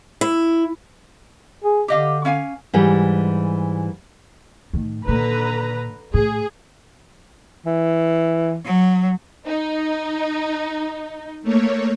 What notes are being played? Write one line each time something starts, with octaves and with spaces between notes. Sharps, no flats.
E4
G#4
D3 G4 D#5 F5
C#4 F5 G#5
G#2 E3 G3
A2 D#3
A#2 D3 D#3 B4 A#5
A2 G#4
E3
F#3
D#4
A3 A#3 C#5